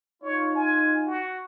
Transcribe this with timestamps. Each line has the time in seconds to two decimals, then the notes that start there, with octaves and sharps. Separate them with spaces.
0.23 D#4 F4 C#5
0.55 G#5
1.06 F#4